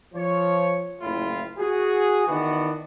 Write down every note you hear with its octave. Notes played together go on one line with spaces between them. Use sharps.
F3 C#5
F#1 A2 E4 F4
F#4 G#4
D#3 E3 B3 D4 F#4